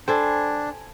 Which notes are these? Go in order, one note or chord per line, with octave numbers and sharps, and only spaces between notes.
D4 A4 C5 G5 G#5 B5